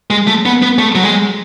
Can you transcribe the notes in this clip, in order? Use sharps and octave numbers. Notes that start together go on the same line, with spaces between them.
G#3
A3
B3
B3
A3
F#3
G#3